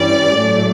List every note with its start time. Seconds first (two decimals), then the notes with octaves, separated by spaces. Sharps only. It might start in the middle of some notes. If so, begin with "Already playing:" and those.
Already playing: G2 E3 G3 C#4 D5
0.36 A2 F#3 A3